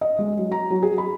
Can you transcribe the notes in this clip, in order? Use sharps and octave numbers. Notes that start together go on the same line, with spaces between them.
D#5
G#3
F#3
A#5
F#3
G#4
B5